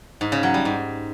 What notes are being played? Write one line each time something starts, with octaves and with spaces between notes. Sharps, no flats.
G#2
C#3
F#3
G3
G#2